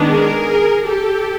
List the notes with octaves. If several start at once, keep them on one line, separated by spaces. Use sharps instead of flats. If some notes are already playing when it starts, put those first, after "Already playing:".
Already playing: D#3 G#3 B3 D4
G#4 A#4
G4 A4